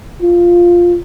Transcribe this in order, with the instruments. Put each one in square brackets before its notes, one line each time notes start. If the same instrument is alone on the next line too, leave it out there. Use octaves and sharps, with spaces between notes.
[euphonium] F4